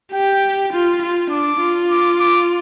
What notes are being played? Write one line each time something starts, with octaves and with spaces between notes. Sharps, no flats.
G4 G5
F4
F4
D4 D6
F4
D6
D6